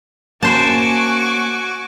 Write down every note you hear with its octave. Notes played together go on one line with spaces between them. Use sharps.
A#3 C#4 F#4 C5 G#5 A5 C#6 D6